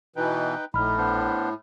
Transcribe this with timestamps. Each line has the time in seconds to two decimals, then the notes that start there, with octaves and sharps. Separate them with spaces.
0.16 B2 E3 D#4 B4 G5
0.74 A#1 A2 D#4 B5 F6
0.97 B3 D4 C5